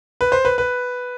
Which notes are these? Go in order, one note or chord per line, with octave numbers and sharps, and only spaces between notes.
B4
C5
B4
B4